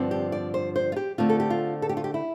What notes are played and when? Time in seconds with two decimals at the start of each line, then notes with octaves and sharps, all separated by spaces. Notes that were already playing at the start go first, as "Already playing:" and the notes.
Already playing: G2 D3 F3 C4
0.11 G4
0.32 D5
0.54 C5
0.76 C5
0.92 F4
0.96 G4
1.18 D3 A3 C4 F4
1.30 A4
1.40 G4
1.50 F4
1.82 A4
1.89 G4
1.97 F4
2.04 G4
2.14 E4